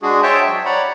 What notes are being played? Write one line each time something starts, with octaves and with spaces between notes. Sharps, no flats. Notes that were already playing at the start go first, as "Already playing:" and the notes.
G#3 D4 F#4 G#4
C5 C#5 E5 G5 A5
F#3 D#5
C#5 D5 F#5 A#5 B5